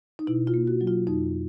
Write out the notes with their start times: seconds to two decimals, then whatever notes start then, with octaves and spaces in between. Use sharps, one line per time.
0.19 D#4
0.27 B2 E4
0.47 F4
0.54 A#3
0.67 F#4
0.81 F#3
0.87 F4
1.07 F2 D#4